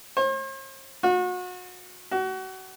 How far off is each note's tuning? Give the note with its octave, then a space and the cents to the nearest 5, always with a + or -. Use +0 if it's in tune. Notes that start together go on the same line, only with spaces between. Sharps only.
C5 +45
F#4 -35
F#4 +30